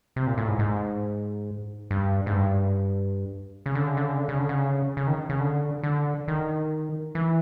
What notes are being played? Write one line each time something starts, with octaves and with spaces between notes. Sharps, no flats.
C3
A#2
A2
G#2
G#2
G2
G#2
G2
C#3
D3
C#3
D3
C#3
D3
C#3
D3
C#3
C#3
D#3
C#3
D3
D3
D#3
E3